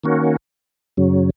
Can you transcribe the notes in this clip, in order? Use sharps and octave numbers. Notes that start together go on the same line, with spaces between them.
D#3 A#3 C#4 F#4
F#2 C#3 F#3